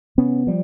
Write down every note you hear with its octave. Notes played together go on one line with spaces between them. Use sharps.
C3 B3 C#4
F3 G3